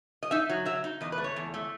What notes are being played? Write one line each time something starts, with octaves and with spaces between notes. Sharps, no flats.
D#5
D#4 E5
F#3
F#3 E5
D#4
E2 D#5
B4
A3
C#5
E2
A3